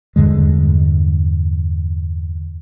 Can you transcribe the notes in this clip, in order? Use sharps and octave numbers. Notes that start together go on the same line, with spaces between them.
E2 G2 D3 G#3